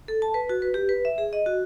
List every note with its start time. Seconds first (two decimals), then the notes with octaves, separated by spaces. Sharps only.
0.08 A4
0.22 A5
0.34 B4
0.49 F#4
0.62 B4
0.74 G4
0.89 B4
1.05 E5
1.18 G#4
1.33 D#5
1.46 F#4